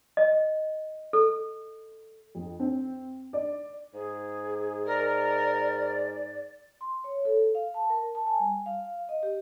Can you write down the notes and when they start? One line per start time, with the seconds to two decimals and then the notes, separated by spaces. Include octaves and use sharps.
0.17 D#5
1.13 A4
2.35 F2
2.60 C4
3.33 D5
3.94 G#2 G#4
4.86 A#4 D5
6.81 C6
7.04 C#5
7.25 A4
7.55 F5
7.74 A5
7.90 A#4
8.15 A5
8.26 G#5
8.40 G3
8.66 F5
9.09 D#5
9.23 G4